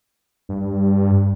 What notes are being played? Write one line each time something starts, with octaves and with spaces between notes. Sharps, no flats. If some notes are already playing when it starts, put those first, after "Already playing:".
G2